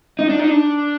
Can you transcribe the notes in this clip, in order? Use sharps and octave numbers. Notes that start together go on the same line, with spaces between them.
D#4
D4
D#4
D4